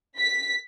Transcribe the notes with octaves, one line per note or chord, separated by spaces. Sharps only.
B6